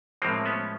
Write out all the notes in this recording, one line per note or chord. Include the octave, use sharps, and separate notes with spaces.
A2 F3 G#3 A#3 C4
B3 C#4